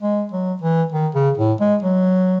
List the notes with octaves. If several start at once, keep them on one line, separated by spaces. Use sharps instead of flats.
G#3
F#3
E3
D#3
C#3
A2
G#3
F#3